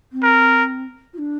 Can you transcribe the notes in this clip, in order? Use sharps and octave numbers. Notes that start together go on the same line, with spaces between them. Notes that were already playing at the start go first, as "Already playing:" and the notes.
C4
A#4
F4
D4